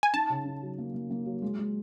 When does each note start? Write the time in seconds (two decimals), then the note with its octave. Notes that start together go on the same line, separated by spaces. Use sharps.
0.03 G#5
0.13 D#4 A5
0.30 C#3
0.45 D#4
0.62 F#3
0.78 A#3
0.94 A#3
1.10 A#3
1.26 F#3
1.42 G#3
1.59 G#3